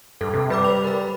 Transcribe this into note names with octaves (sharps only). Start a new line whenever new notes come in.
G2 A4
C3
G3 B4 B5 D6
C5 F7
A#4 B5